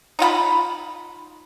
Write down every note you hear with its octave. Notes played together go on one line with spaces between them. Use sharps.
D#4 F4 F5 B5